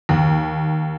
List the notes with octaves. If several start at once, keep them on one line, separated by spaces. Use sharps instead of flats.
D#2